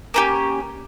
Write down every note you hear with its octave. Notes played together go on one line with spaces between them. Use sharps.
A#3 C#4 G4